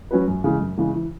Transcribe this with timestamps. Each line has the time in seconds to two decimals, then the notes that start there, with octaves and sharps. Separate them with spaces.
0.11 F#3 C#4 F#4 B4
0.28 F#2
0.44 C#3 E3 G#3
0.61 F#2
0.77 C#3 E3 G#3
0.94 E3